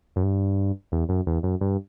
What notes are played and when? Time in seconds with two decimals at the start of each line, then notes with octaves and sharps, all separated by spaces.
0.16 F#2
0.23 G2
0.92 E2
1.09 F#2
1.27 E2
1.43 F#2
1.61 G2